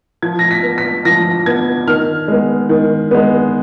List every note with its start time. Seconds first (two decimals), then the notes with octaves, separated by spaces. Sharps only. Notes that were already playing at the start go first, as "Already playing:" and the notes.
0.22 F3 G#6
0.39 A#6
0.51 B6
0.63 B3
0.78 B6
1.05 F3 A#6
1.46 B3 G#6
1.87 D#3 F6
2.28 G#3 B3
2.69 D#3
3.11 G#3 B3